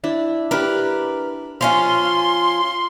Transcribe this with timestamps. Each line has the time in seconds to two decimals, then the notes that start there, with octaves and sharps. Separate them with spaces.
0.04 D4 E4
0.51 D4 G4 A#4 B4
1.61 F3 C#4 F4 F5 C6